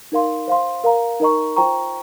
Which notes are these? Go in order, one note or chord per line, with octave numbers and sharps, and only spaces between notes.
D#4 A#4 F5 C6
C5 F5 C6
A#4 F5 A#5
D#4 A#4 D#5 A#5 C#6
F4 C5 G5 A#5 C#6